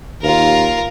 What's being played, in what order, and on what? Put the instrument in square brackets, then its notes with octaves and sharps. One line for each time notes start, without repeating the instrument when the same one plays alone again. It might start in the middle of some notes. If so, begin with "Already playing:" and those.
[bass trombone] D#2 [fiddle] F4 A#4